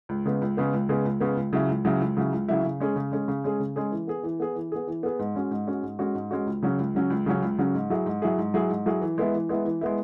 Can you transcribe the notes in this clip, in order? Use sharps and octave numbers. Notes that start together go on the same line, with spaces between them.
C#2
C#3 G#3 B3
C#2
C#3 G#3 B3
C#2
C#3 G#3 B3
C#2
C#3 G#3 B3
C#2
C#3 F#3 E4
C#2
C#3 F#3 E4
C#2
C#3 F#3 E4
C#2
C#3 F#3 E4
C#3
G#3 C#4 G#4
C#3
G#3 C#4 G#4
C#3
G#3 C#4 G#4
C#3
G#3 C#4 G#4
E3
B3 G#4
E3
B3 G#4
E3
B3 G#4
E3
B3 G#4
G#2
G#3 C#4 F#4
G#2
G#3 C#4 F#4
G#2
G#3 C#4 F#4
G#2
G#3 C#4 F#4
C#2
C#3 F#3 C#4
C#2
C#3 F#3 C#4
C#2
C#3 F#3 C#4
C#2
C#3 F#3 C#4
G#2
F#3 E4 G#4
G#2
F#3 E4 G#4
G#2
F#3 E4 G#4
G#2
F#3 E4 G#4
E3
G#3 B3 E4
E3
G#3 B3 E4
E3
G#3 B3 E4